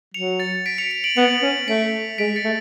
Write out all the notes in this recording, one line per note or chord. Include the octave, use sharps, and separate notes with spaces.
F#3 C#7 F7
A6 C#7
B6 D7
C#7 F7
C#7 F7
D7 F#7
B3 C#7 F7
C#4
A3 B6 D7
G#3 B6 D7
A6 C#7
A3